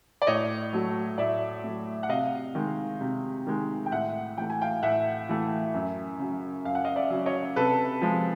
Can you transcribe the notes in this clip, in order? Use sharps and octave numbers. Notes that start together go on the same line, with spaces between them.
D5
A2 C#5 D#5
F#3 A3
A2 D5 E5
F#3 A3
F#5
C3 D#5 F5
D#3 G#3
C3
D#3 G#3
G5
A2 E5 F#5
E3 A3 G5
G#5
F5 G5
A2 E5 F#5
E3 A3
F#2
C#3 F#3
F#2 F5
F#5
D#5 F5
D5 E5
C#3 F#3
C#5 D#5
C3 A4 B4
F3 G#3